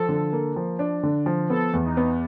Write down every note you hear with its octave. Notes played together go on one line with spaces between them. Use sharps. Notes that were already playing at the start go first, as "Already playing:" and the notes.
Already playing: F3 A4
D3
A#3
F3
D4
D3
F3
B3 A4
E2
D#4
B3